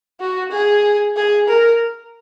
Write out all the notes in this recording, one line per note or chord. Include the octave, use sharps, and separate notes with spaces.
F#4
G#4
G#4
A#4